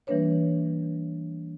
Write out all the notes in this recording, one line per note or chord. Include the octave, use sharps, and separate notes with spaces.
E3 G3 A#3 D4 B4 C#5